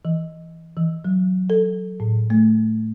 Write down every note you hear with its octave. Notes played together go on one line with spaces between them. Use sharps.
E3
E3
F#3
A4
A2
A3